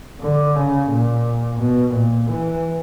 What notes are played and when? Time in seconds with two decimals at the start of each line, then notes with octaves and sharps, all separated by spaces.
0.21 D3
0.56 C#3
0.90 A#2
1.59 B2
1.94 A#2
2.29 E3